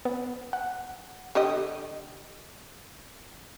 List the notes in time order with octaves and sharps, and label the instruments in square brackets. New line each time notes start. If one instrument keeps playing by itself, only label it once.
[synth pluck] B3
F#5
[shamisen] D3 G4 D#5